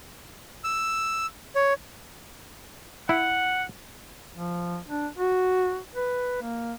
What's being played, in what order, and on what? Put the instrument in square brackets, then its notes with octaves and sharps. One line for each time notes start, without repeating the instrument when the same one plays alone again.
[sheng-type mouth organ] E6
C#5
[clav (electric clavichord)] E4 [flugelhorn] F#5
[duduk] F3
D4
F#4
B4
A#3